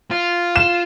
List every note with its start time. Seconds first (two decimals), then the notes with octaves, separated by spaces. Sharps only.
0.11 F4
0.56 E7